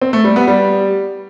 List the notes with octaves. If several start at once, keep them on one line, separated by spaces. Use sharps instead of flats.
C4
A3
G3
B3
G3